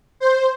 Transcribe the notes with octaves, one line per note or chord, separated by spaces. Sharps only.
C5